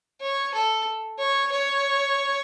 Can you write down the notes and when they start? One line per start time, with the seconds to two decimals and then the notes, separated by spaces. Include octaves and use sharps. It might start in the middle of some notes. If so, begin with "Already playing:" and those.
0.21 C#5
0.54 A4
1.19 C#5
1.51 C#5